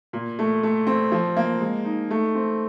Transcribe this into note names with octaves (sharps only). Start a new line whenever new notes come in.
A#2
A3
A3
C4
F3
A#3
G#3
D#4
A3
C4